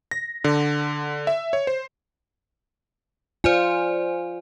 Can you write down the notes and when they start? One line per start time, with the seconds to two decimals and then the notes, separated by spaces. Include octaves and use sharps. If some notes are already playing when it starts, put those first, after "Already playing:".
0.11 A#6
0.44 D3
1.27 E5
1.53 C#5
1.67 C5
3.44 F4 C5 D5 G#5